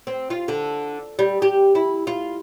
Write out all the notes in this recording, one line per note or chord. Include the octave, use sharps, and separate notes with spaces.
C4
F4
D3
G3
G4
E4
F4